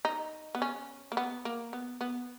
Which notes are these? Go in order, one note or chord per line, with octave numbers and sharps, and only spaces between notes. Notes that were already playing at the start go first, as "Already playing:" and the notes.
D#4
B3
C#4
A#3
B3
A#3
B3
B3